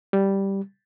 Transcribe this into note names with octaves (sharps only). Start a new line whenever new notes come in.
G3